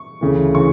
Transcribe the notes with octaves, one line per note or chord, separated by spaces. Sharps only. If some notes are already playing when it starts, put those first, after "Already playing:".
Already playing: C#6
D2 C#3 E3
C#3 E3 C#6